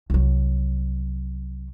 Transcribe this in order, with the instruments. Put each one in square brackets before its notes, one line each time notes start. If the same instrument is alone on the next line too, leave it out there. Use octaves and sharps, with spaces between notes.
[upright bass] C2 F#3